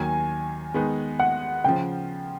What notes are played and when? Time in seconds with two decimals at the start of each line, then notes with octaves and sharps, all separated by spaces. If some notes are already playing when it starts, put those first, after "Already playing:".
Already playing: D#2 D#3 F#3 G#5
0.74 D#3 G#3 B3 D#4
1.19 F#5
1.64 C#3 F3 G5